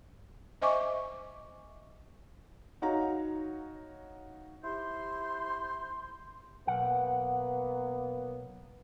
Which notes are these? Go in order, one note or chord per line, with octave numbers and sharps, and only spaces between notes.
C5 D#5 E5 G#5 C#6 D6
D#4 F#4 C#5 F5 A#5
E4 G4 C5 C6
B1 A#3 B3 F#5